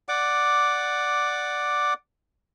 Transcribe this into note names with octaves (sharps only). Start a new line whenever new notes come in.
D5 F#5 D6